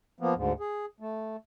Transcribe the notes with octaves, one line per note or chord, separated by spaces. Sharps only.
F3 A#3 B3
D2 G#2
G#4
A3